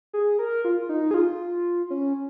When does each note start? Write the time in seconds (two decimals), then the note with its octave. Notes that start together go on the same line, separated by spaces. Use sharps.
0.14 G#4
0.39 A#4
0.65 F4
0.89 D#4
1.11 G#4
1.14 F4
1.90 C#4